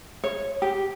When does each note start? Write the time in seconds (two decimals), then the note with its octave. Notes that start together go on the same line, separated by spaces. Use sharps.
0.24 C#5
0.62 G4